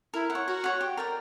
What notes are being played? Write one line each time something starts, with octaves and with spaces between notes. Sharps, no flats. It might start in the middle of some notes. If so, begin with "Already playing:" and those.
E4 A#4
F#5
C#5
F#4 A#4
C#5 F#5
G4
A#4 D5 G5